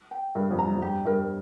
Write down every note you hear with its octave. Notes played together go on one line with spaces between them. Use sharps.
G5
G2 A#4
F2
A#5
G2
F2
G2 G4
G2 A#4